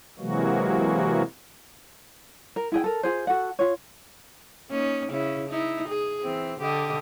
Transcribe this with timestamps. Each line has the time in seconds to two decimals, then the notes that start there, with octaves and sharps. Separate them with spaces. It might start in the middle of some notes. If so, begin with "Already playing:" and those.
0.19 C3 E3 F#3 G#3 A#3 F#4
2.56 A#4
2.72 E4 G#4 G5
2.84 A4 A#4
3.03 F4 G#4 C5
3.27 F#4 A4 F#5
3.59 F4 C#5
4.69 A#3 C#4 D#4
5.10 C#3 C#4 E4
5.49 D#4 E4
5.89 G#4
6.23 E3 C4
6.60 D3 G4 D#5